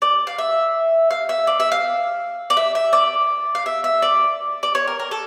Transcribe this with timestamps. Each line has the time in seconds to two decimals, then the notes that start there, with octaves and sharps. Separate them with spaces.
0.02 D5
0.27 F5
0.38 E5
1.11 F5
1.29 E5
1.47 D5
1.60 E5
1.72 F5
2.50 D5
2.57 E5
2.75 E5
2.93 D5
3.55 F5
3.66 E5
3.84 E5
4.02 D5
4.63 D5
4.75 C#5
4.87 A#4
4.99 A#4
5.11 A4